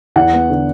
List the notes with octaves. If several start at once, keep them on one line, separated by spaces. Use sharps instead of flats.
E2 F#5
B3
D3